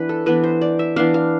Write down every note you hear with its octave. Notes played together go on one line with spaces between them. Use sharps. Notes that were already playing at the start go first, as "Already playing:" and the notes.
Already playing: E3 B3 D4 B4
A4
E3 B3 D4 B4
C5
D5
E5
E3 B3 D4 F5
F5